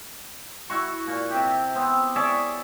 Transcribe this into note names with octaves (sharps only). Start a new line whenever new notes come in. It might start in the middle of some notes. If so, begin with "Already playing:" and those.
E4 F#4 C#6
A#2
C3 G4
B3 C4
G#4 C#5 D5 E5